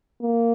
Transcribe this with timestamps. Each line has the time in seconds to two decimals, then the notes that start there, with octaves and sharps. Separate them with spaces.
0.22 A#3